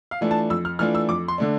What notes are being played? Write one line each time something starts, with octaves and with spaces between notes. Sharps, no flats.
F5
E3 A3 D4 F4
A5
F2 E6
F6
E3 A3 D4 F4 F6
E6
F2 D6
C6
D3 A3 D4